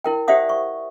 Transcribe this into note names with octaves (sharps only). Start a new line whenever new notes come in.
E4 A#4 G5
G4 C5 D5 E5 F#5 D#6
C#6